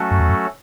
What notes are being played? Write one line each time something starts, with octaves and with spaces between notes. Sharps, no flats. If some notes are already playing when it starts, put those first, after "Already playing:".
Already playing: F#3 A3 C#4 F#4 A4
F#2
E2
F#2